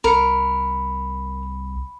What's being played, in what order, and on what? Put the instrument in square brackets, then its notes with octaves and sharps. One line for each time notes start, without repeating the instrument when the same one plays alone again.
[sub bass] C2 [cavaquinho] A#4 [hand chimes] B5 C#7